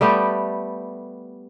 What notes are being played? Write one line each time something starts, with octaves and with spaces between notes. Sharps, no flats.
G3 A3 B3 G4